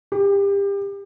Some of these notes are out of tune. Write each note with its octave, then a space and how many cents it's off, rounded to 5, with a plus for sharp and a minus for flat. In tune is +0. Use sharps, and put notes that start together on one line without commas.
G4 +30